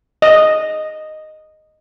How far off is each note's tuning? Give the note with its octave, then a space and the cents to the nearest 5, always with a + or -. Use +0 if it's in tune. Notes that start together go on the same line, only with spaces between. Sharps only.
D#5 -5